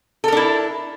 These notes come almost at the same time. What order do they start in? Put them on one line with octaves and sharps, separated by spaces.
A4 A#4 D4 E4